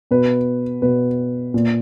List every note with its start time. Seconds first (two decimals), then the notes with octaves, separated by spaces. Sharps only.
0.11 B2 B4
0.82 B2 B4
1.54 A#2